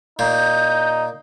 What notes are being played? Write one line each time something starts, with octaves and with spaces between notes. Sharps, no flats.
A#2 D#4 G6